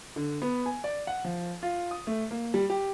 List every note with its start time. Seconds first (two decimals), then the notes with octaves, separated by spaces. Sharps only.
0.16 D3
0.42 B3
0.66 G#5
0.84 D5
1.07 F#5
1.24 F3
1.63 F4
1.91 D#6
2.07 A3
2.31 A#3
2.54 G3
2.70 G4